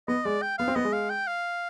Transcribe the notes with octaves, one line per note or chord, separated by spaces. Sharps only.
B3 D#5
G#3 D5
G5
B3 F5
C4
B3 D#5
G#3
F5
G5
F5